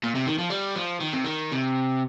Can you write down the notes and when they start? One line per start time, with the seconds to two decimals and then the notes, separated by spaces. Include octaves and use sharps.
0.03 A#2
0.15 C3
0.27 D#3
0.38 F3
0.50 G3
0.76 F3
1.01 D#3
1.13 C3
1.25 D#3
1.52 C3